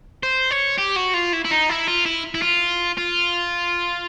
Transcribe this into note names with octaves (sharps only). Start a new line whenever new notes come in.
C5
C#5
G4
F#4
F4
E4
E4
D#4
E4
F4
E4
E4
F4
F4